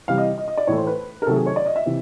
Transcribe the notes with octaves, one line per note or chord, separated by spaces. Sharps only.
C3 E3 G3 F5
D#5
D#5
D#5
D5
A2 E3 A3 C#5
C5
B4
A#4
C3 D#3 F#3 A3 A4
G#4
C#5
D5
D#5
E5
C3 E3